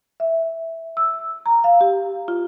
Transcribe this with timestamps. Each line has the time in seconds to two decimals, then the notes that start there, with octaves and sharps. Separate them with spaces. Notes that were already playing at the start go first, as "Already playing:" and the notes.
0.20 E5
0.97 E6
1.46 A#5
1.64 F5
1.81 G4
2.28 F4